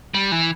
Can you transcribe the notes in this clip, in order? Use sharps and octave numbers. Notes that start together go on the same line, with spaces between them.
G3
E3